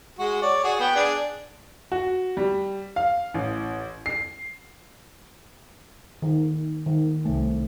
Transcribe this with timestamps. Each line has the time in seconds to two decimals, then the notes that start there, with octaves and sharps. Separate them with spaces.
0.19 G#3 F#4
0.42 C#5 D5
0.64 F#4 G#4
0.80 B3 F#5 G5
0.95 D4 G#4
1.92 F#4
2.37 G3
2.96 F5
3.34 A1
4.06 C7
6.22 D#3
6.86 D#3
7.25 C2 A3